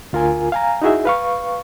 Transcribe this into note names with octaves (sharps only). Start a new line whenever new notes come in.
D2 F4 A#4 G#5
F5 G#5 A#5
D#4 E4 F#4 G#4 E5
B4 F5 C#6